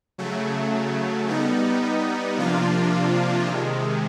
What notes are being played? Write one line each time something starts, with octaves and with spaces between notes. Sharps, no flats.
C#3 F#3 A3
G3 B3 D#4
C3 F3 A#3 D4 F4
C3 D#3 G#3